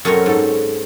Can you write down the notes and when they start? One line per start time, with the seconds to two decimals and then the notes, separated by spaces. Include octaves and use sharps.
0.05 F#2 A3 C4 A#4 C#5
0.26 G#2 A4